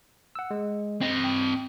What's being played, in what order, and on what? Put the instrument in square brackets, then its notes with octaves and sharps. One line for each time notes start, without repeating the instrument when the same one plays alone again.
[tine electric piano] F#5 E6
G#3
[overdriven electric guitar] C4 D#5
[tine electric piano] G5